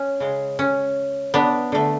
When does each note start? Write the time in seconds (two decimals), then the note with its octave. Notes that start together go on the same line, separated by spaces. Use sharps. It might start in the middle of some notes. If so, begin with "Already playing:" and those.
Already playing: C#4
0.20 C#3 G#3
0.59 C#4
1.34 B3 D4
1.72 D3 A3